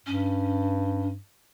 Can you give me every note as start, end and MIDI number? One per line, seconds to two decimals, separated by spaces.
0.06 1.17 43
0.06 1.09 61